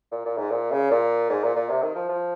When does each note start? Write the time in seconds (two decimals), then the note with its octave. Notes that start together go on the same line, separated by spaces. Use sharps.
0.12 A#2
0.25 A#2
0.37 G#2
0.51 A#2
0.71 C#3
0.91 A#2
1.30 G#2
1.44 A#2
1.56 A#2
1.69 C3
1.82 D#3
1.95 F3
2.09 F3